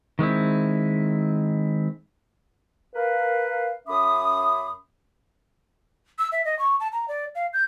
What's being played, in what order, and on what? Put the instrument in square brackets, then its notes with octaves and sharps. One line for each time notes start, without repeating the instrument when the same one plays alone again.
[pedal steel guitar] D#3 G#3 C4 E4
[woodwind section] A#4 B4 F5
F#2 C#4 E5 B5 D6 D#6
[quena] E6
E5
D#5
C#6
A5
A#5
D5
F5
G6